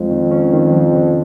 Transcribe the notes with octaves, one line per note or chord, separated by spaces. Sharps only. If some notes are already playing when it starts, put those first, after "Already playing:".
Already playing: F2 G#3
D#3
C#4
D#3
F3
C#3